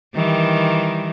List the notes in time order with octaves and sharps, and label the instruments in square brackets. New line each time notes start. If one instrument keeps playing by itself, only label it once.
[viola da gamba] D#3 E3 G3